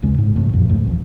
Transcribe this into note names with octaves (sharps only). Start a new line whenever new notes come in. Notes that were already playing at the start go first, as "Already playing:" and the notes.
D1 D#2 C#3 G#3
G#2
A1 G2 C3 A3
F2 A#2 F3
E1 C#2 G#2 A3
D#1 A1 F2